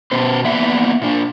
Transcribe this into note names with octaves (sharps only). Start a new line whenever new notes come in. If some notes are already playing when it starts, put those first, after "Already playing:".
B2 B3 C5
A#3 B3 D5 E5 F#5
A#2 D4